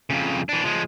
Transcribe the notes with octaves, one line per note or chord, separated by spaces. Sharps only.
F2 C#3
E3 D4
F3 G#3